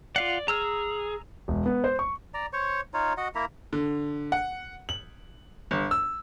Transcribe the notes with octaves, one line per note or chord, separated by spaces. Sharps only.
F4 D5 F5 F#5
G#4 A#5 E6 F6
E1
B3
C5
C#6
D5 A#5
C5 C#5 C#6
D#4 F4 C#5
F#4 D#5 F#5
A#3 E4 E5 A#5
D3
F#5
F#7
G1
E6